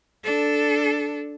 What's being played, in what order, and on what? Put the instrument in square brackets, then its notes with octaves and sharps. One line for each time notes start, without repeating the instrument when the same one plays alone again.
[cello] D4 A4